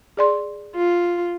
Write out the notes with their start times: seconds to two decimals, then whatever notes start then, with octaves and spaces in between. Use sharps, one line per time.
0.17 G#4 D5 C6
0.76 F4